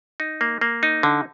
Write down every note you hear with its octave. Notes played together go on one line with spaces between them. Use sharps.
D#4
A#3
A#3
D#4
D3